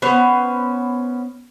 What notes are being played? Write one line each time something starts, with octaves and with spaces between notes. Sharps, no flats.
B3 C#4 C5